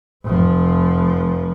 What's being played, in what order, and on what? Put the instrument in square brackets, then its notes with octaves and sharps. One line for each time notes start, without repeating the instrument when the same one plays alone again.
[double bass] F1 F3